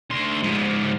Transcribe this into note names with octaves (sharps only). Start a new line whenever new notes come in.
D2 C6
G#2 F3